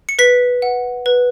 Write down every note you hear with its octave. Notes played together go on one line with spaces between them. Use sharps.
C#7
B4 B6
F#5
B4